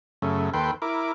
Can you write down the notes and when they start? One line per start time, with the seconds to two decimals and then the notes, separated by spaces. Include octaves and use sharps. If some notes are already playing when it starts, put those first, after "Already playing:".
0.22 F#2 C#3 A3
0.54 D#2 A4 B4 G5 C6
0.82 E4 A#4 D6